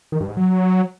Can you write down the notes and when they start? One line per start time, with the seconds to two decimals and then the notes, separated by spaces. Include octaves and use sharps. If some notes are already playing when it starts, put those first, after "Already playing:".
0.12 D#3
0.20 G2
0.29 G#2
0.37 F#3